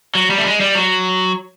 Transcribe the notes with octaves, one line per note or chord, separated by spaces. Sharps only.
F#3
G3
A3
G#3
G3
F#3